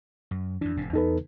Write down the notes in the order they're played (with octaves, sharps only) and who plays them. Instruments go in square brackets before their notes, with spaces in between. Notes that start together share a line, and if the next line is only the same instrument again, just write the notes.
[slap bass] F#2
[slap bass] F2 E3 [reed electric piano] D4
[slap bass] F1 A2 C3
[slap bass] E2 B3 [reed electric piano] D#4 A4 B4